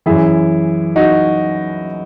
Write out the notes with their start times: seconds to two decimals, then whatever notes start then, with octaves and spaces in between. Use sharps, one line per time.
0.06 F#2 E3 E4 G#4
0.96 D#4 F#4